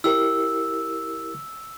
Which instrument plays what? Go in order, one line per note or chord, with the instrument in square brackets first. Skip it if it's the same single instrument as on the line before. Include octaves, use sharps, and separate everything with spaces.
[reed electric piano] E4 G4 A#4 [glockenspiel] E6